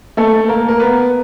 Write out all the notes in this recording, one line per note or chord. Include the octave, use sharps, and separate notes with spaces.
A3 A4
A#3 A#4
A#4
B3 B4